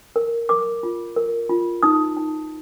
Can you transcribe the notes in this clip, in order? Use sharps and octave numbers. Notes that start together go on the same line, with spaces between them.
A#4
A#4 D6
F4
A#4
F4
D#4 D#6
D#4